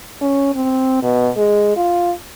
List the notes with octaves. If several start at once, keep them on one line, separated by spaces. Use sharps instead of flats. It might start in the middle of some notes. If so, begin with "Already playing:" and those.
C#4
C4
B2
G#3
F4